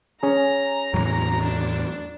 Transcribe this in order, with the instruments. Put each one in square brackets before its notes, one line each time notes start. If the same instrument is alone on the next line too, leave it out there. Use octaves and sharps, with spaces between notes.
[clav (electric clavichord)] C#4 G#4 [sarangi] A#5
[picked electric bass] E2 A2 F#3
[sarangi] D4